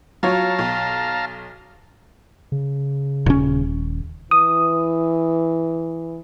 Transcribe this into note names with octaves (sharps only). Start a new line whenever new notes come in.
F#3 F4 C#5 F5 A5 A#5
B1
C#3
D#1 C#4
E3 D#6